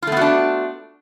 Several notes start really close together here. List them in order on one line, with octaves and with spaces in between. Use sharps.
F4 A3 B3 F#4 D4